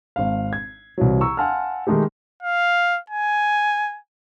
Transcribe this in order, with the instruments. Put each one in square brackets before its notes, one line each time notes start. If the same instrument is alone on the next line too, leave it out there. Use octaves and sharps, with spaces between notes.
[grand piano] G#1 F5
G#6
C2 E3 F#3
A#5 C#6 E6
F5 F#5 G#5 A5 C6 F6
D#3 G#3 A3 D#4 G4
[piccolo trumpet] F5
G#5